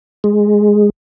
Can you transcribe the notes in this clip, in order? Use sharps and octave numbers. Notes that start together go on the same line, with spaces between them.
G#3